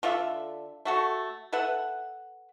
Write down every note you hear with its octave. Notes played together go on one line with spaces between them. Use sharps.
D3 F4 A4 E5
A3 F#4 A4
A4 B4 E5 F#5